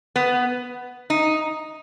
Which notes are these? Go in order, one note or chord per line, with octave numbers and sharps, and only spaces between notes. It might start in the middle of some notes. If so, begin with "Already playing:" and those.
B3
D#4